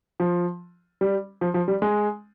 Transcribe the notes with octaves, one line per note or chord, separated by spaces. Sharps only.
F3
G3
F3
F3
G3
G#3